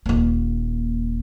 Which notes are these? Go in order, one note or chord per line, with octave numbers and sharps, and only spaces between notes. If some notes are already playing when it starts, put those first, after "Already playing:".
D#1 A#3